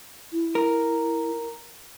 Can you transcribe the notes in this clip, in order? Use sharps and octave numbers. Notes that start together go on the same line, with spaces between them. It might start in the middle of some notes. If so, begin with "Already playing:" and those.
E4
A#4